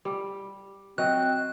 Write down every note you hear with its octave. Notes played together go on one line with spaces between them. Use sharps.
G3
F#3 C4 D#5 F#6